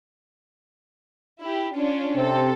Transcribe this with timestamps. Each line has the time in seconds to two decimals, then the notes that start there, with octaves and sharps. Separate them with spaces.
1.42 E4 G4
1.74 C#4 D4 F4
2.15 C3 C4 A4